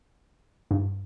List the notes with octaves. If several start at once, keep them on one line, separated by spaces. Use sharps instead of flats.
G2